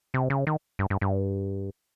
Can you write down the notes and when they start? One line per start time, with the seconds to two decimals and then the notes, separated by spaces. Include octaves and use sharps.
0.14 C3
0.30 C#3
0.47 D#3
0.79 G2
0.90 G2
1.01 G2